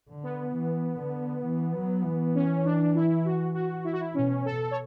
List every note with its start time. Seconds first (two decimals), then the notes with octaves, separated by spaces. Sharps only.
0.09 D3
0.23 B3
0.54 E3
0.99 D3
1.44 E3
1.74 F#3
2.04 E3
2.35 C#4
2.65 D4
2.95 E4
3.25 F#4
3.54 F#4
3.84 E4
3.93 F#4
4.00 E4
4.14 B2 C#4
4.45 A4
4.71 C#5